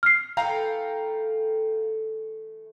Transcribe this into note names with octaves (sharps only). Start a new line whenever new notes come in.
F6 C7
E3 A3 A4 F5 G5 A#5